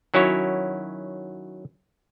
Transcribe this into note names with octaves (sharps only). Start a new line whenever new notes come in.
D#3 F#3 C#4 E4 F#4 C#5